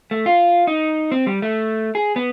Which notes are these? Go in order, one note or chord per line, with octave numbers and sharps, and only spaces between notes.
A3
F4
D#4
C4
G3
A3
G#4
B3